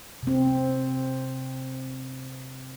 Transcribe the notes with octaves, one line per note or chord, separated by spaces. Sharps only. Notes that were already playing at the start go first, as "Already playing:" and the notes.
C3 C4